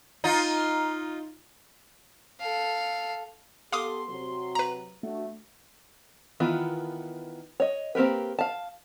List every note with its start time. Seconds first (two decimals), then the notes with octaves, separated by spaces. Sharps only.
0.24 D#4 F4
2.40 A4 F5
3.73 B3 G4 A4 F5 C6 D6 D#6
4.09 C3 F#3
4.55 B4 A#5
5.03 A3 D4 F#4
6.40 D#3 E3 B3 F4
7.60 C#5 D#5
7.95 A#3 C4 G4 A#4 B4
8.39 F5 A5